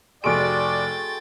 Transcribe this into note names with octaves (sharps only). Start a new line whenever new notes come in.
F1 G#3 A3 F#4 D5 G5 A6 D7